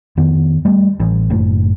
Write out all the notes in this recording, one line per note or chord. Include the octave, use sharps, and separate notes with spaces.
F2 D#3 B3
G3 A3
A1
F#1 A2